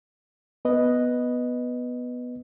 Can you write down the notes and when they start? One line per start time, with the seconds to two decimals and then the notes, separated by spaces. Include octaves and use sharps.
0.65 B3 B4 D#5